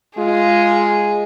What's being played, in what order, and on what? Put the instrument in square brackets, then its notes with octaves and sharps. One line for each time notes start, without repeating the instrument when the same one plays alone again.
[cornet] G#3 [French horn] F4 [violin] G#4